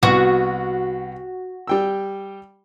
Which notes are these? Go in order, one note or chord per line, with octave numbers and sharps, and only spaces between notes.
C2 B3 F#4 C#6
G3 G5 E6